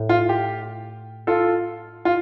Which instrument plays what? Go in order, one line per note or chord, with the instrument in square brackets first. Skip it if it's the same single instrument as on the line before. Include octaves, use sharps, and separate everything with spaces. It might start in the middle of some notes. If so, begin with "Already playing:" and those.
Already playing: [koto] A2
[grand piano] F4
G4
F4 A4
F4